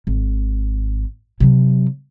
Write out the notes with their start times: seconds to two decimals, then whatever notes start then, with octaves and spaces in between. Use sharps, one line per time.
0.07 G#1
1.40 C3 F#3